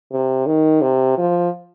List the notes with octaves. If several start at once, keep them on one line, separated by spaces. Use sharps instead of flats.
C3
D#3
C3
F3